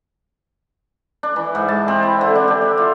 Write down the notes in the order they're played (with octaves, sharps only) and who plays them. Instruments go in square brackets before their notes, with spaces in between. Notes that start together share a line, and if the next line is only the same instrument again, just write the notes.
[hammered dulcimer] D4
E3
G#2
A5
C4
E4
D3
D4
G4
E5
F4